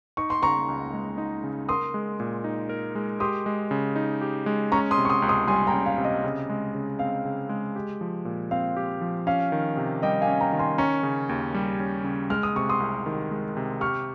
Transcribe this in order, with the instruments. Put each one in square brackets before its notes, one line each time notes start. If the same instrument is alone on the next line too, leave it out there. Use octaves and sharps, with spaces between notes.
[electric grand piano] D#4 [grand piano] C#6
[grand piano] C6
[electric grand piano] C#3 [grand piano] A#5 C#6
[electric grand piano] C#2
G#3
D#4
C#3
[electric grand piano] A#4 [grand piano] C6 D#6
[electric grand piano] G#3
A#2
D#4
A#4
G#3
[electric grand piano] G4 [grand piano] C6 D#6
[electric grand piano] G#3
C#3
D#4
G4
G#3
[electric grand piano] C#4 [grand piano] A#5 C#6
[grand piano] C6 D#6
[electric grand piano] C3
[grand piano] C#6
C6 D#6
[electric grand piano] C#2
[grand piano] C6 D#6
[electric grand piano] G3 [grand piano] G#5 C6
[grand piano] G5 A#5
[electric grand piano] C#4
[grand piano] F5
[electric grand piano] C3
[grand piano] D#5
[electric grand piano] C#3
G#3
C#3
[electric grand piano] C4 [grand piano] F5
[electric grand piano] C#3
G#3
G4
F3
A#2
[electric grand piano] C4 [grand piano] F5
[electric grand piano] G4
F3
[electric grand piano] C#4 [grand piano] F5
[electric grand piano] D#3
C3
[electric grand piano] G3 [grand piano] D#5 G5
[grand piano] F5 G#5
[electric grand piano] C#4
[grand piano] G5 A#5
[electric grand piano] D#3
[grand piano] G#5 C6
[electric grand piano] C#4 [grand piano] A#5 C#6
[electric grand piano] C#3
D#2
G3
C#4
C#3
[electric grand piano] G#3 [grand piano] F6
[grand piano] D#6
[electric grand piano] C3 [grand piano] C#6
[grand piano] C6 D#6
[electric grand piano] C2
D#3
G#3
C3
[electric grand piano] G4 [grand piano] C#6 F6